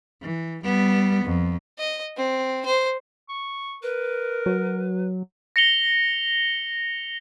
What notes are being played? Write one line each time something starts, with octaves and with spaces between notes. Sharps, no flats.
E3
G3 B3
F2
D#5
C4
C5
C#6
A#4 B4
F#3
A#6 C#7 F7 G7